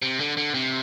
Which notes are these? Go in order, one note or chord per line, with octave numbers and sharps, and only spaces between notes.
C3
D3
D3
C3